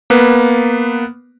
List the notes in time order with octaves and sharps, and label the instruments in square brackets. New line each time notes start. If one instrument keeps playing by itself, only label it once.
[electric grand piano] A#3 B3 B4